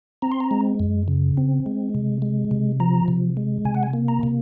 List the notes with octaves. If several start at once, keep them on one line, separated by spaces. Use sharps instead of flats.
C4 A#5
C6
A#5
G#3
F#2
C#3
C4
G#3
C3
G#3
C3
F3 A#5
C3
G#3
C3 G#5
F#5
G#5
A#3
A#5
C3